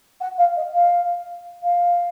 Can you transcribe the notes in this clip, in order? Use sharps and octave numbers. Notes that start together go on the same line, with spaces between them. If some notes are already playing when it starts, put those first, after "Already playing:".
F#5
F5
D#5
F5
F5